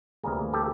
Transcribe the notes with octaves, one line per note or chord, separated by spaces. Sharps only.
D2 C3 E3 G3 A#3 G#4 A#4
G4 A4